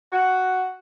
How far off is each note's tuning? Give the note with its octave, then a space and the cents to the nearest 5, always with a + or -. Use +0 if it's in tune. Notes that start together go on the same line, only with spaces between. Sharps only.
F#4 +5